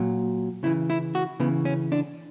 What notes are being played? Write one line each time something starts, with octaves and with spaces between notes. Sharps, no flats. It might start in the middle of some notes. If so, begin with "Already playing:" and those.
Already playing: A#2 F#3
C#3 E3 E4
E4
F#4
C#3 E3 B3
C#4
D4